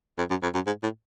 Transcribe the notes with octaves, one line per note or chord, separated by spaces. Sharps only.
F2
F#2
F2
F#2
G#2
A2